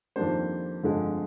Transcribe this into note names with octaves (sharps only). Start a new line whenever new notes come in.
F2 D#3 G3 A#3 D4 C5
G1 F2 D3 G#3